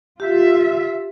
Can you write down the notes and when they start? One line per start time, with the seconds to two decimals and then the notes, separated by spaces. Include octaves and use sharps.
0.20 F4 G4 E5